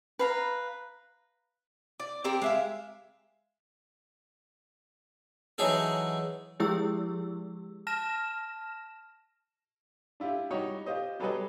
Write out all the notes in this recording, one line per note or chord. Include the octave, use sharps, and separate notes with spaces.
B4 F5 A#5
D5
C4 G4 A#4
G#3 E5 F5
E3 F#3 D#4 G#4 A4
F3 G#3 E4 G4 G#4 E6
A5 F6 A#6 E7
D4 E4 F4 G4
G3 D#4 F#4 C#5
F4 G4 C5 D#5
F#3 G3 G#4 A4 B4 D#5